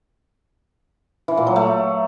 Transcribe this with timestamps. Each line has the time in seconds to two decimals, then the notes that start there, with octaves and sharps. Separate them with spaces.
1.28 E3
1.37 A#2
1.47 F#3
1.56 A3